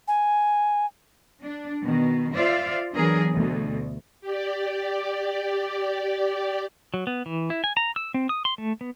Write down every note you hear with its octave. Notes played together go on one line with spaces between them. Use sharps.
G#5
D4
B2 D#3
F4 C5 D5 E5 F5
E3 F#3 B3 D4 G#4 A#4
D2 B2
G4 D5
F#3
B3
E3
E4
G#5
A#5
E6
C4
D#6
C6
A3
B3